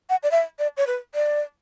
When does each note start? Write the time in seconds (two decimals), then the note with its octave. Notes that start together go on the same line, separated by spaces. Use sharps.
0.10 F#5
0.23 D5
0.31 E5
0.59 D5
0.77 C#5
0.87 B4
1.15 D5